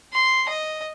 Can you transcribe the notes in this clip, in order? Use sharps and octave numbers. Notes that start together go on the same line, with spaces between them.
C6
D#5